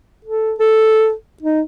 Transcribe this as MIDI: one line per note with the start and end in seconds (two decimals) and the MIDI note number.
0.25 0.53 69
0.59 1.12 69
1.42 1.60 63